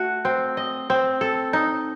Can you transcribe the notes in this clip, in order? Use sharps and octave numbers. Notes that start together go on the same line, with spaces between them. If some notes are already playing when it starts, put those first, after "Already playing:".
Already playing: A3 F#4
C4
D#5
C4
A4
D#4